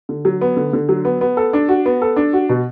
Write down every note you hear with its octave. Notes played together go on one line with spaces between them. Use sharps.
D3
F#3
B3
D3
D3
F#3
B3
B3
A4
D4
F#4
B3
A4
D4
F#4
B2